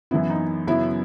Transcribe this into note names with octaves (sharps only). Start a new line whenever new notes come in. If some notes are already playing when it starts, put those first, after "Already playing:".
F#2 E3 B3 E4
D#4
F#2 C#3 F#3 B3 E4